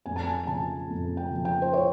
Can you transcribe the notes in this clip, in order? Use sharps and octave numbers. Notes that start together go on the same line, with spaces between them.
F2 G#5
A5
G#5
C#3 F3 A5
F2
G5
C#3 F3
G5
C5
C#5